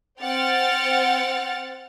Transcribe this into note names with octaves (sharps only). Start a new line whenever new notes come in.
C4 F#5 G5 F6 A6